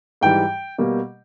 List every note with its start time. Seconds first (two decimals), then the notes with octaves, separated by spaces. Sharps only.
0.21 G#2 E3 G3 G5
0.78 B2 G3 A#3